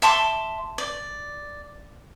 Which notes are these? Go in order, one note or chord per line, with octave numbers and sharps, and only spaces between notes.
E5 A5 C6 D6
D5